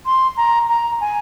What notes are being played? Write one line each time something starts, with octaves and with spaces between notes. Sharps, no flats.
C6
A#5
A#5
G#5